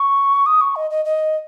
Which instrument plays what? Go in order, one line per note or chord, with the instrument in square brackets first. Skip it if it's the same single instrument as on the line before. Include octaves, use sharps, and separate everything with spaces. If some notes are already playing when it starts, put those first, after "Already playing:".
Already playing: [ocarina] C#6
D#6
C#6
D#5
D#5
D#5